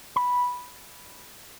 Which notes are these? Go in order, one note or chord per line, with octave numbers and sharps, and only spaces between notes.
B5